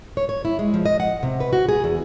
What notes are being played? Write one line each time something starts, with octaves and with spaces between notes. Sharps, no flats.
C#5
C#5
E4
G#3
F3
D#5
F#5
C3
B4
F#4
G#4
E2